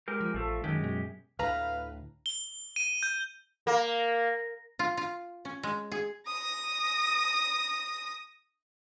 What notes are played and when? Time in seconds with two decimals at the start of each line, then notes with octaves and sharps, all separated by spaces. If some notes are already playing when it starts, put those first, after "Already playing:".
0.08 G#3 G4 A#4
0.21 F3
0.34 A1 F3 A3
0.64 F#2 D#3 G#3 G4
0.84 B2
1.39 D2 A2 B4 F5 A#5
2.26 G7
2.76 D#7
3.03 G6
3.67 A#3
4.79 F4
4.97 F4
5.45 C#4
5.63 G#3
5.92 G#4
6.27 D#6 A#6